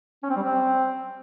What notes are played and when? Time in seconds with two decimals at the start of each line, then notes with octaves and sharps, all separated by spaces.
0.23 C#4
0.30 C4
0.36 G3
0.43 C4